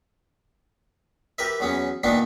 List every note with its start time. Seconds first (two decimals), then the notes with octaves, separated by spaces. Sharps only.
1.38 G4 A#4 B4 E5
1.60 E2 F#3 B3 C#4
2.03 A#2 D#3 A#3 B3 D4